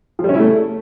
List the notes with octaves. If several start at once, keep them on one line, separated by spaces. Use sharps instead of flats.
F3
G3
C#4
E4
A3